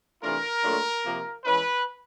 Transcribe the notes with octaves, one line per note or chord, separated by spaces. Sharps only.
C3 E3 A3 D4 F4 A#4
A#2 F#3 A3 D4 F4
C3 F3 A#3
E3 G#3 C#4 E4 B4